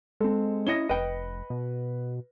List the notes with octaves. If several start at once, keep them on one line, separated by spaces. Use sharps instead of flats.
G#3 C4 A4
C#4 E4 D#5 A#6 C#7 G7
F1 B4 D#5 G5
B2